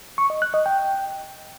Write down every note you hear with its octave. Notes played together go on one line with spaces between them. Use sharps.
C#6
D#5
F#6
D#5
G5